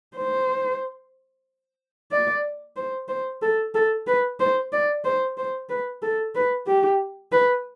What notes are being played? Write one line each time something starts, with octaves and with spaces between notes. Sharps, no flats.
C5
D5
C5
C5
A4
A4
B4
C5
D5
C5
C5
B4
A4
B4
G4
B4